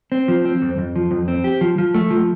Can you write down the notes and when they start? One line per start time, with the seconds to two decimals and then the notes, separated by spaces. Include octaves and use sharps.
0.12 C4
0.28 F3
0.45 C4
0.62 F2
0.78 F2
0.96 F3
1.11 F2
1.28 C4
1.44 G4
1.61 F3
1.78 F3
1.94 A3
2.10 F3